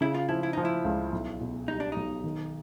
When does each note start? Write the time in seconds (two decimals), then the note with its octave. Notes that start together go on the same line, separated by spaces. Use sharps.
0.01 C#3 E4
0.15 F4
0.29 F3 E4
0.43 E4
0.53 F3 D#4
0.65 E4
0.85 C#2
1.12 B1
1.40 B2
1.68 G3 D#4
1.80 D4
1.92 B1 D#4
2.24 D#3